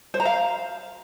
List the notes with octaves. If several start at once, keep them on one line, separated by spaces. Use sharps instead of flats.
C5
A#5
F5